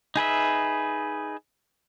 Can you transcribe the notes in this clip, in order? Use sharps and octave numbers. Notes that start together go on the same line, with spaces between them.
D#4 G#4 B4 E5